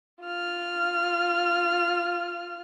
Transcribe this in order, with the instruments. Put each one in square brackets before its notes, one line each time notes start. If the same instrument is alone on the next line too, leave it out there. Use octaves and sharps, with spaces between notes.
[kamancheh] F4 F6